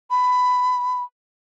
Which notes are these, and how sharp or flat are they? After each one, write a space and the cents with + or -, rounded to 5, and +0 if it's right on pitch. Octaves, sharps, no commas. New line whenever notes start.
B5 +15